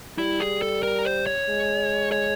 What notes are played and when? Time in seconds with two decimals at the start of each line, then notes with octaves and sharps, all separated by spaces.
0.18 G3 E4
0.40 G#4
0.62 A4
0.83 A#4
1.05 C5
1.27 C#5
1.48 G#3
2.12 C#5